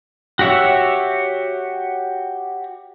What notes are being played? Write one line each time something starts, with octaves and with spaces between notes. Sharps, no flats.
F#4 G4 C#5 E5